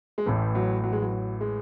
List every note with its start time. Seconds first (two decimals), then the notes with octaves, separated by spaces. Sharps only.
0.18 G#3
0.26 A1 A2 E3 A3
0.55 F#3
0.84 F#3
0.93 G#3
1.02 F#3
1.12 F#3
1.41 G#3